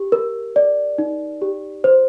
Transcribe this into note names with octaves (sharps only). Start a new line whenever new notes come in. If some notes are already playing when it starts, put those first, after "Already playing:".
Already playing: G4
A#4
D5
D#4
G4
C5